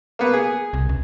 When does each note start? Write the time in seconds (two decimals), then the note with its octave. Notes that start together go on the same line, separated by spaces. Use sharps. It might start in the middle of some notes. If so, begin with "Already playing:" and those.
0.19 A#3 B3
0.33 G#4
0.73 C2
0.89 C#2